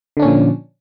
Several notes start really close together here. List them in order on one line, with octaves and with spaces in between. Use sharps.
D3 D4 C#4 A#2 F3